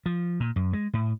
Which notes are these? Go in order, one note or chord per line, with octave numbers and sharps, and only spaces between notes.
F3
A#2
F#2
G#3
A2